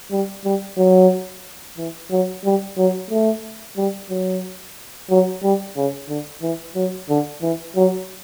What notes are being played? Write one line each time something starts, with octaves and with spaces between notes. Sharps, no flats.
G3
G3
F#3
E3
F#3
G3
F#3
A3
G3
F#3
F#3
G3
C#3
D3
E3
F#3
D3
E3
F#3